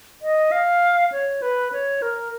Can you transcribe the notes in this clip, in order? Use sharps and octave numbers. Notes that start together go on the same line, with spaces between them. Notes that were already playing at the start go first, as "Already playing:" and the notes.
D#5
F5
C#5
B4
C#5
A#4